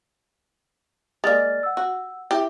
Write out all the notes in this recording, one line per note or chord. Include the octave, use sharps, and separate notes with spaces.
G#3 A#3 D5 F6 A6
F#5 E6
F#4
E4 G4 E5